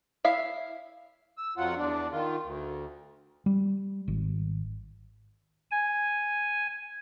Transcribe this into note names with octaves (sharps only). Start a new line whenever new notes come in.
E4 E5 F5
E6
F2 F#3 F4 F#5
E2 D4
D#3 F4
D2
G3
G#1
G#5